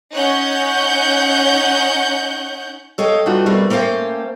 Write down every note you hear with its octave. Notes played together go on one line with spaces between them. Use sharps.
C#4 D#4 C#5 F#5 F#6 G6
A4 C#5 D#5 F5 G5
G3 A3 B3 D#4 F4 F#4
B2 G3 A3 A#3 C4
A3 A#3 C#4 C5 F5 G5